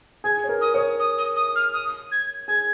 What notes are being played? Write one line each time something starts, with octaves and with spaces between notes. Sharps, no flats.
G#4 G#6
C#5
A#4
D#6
C#5
D#6
D#6
D#6
F6
D#6
G#6
G#4 G#6